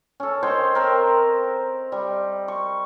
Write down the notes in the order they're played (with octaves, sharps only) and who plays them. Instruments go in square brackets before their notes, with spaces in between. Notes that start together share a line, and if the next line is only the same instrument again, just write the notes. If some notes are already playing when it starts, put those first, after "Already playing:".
[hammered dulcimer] C#4 A4
C5 C#5 D#5 G5
C4 A#4
G3
C#6